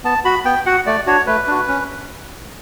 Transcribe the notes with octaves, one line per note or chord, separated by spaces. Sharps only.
B3 A5
F#4 B5
B3 G5
F#4 F#5
A3 D5
D4 F#4 C#5
A3 B4
D4 F#4
C#4